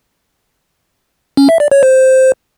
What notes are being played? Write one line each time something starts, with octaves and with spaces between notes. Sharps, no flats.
C#4
E5
D5
C#5
C5